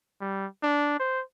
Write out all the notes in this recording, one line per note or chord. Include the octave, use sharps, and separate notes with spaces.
G3
D4
C5